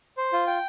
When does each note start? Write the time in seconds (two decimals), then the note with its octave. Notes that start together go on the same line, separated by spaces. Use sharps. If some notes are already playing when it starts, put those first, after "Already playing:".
0.17 C5
0.33 F4
0.47 G5